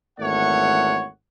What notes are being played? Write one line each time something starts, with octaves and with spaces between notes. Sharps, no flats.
G#1 E2 A3 C#5 F#5